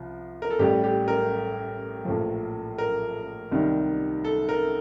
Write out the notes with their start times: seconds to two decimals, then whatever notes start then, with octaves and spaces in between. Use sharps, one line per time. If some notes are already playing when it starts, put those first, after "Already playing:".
Already playing: C2 F3
0.42 A#4
0.50 A4
0.59 A1 A2 G3 G4
0.84 G4
1.08 A#4
2.05 A#1 A2 F3
2.78 A#4
3.51 C2 C3 D#3 G3
4.25 A4
4.49 A#4